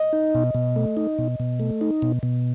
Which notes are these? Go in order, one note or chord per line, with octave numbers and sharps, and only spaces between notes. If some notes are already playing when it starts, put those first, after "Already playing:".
Already playing: D#5
D#4
B2
B2
A3
D#4
B2
B2
A3
D#4
B2
B2